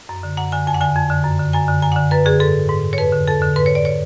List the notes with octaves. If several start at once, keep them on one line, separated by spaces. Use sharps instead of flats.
F#2
D3
F#2 F#5
D3 G#5
F2 G#5
F#5
D3 G#5
F2
D3
F#2
D3
F#2 G#5
D3
F#2 G#5
F#5
D3
F#2 B4
D3 G#4
G#2 A4
G#2
C#5
F2 B4
D3
F2 A4
D3
G#2 B4
C#5
D5
C#5